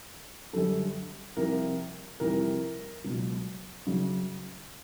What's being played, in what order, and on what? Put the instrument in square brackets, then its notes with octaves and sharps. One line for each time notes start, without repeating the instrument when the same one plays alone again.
[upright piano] F#2 D3 G3 A4
C2 C3 F3 A#4
F2 C3 E3 G3 A#4
C#2 B2 F#3
F#2 C#3 F#3